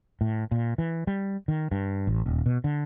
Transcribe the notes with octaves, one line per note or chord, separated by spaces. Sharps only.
A2
A#2
E3
G3
D#3
G2
A1
D#1
B2
D3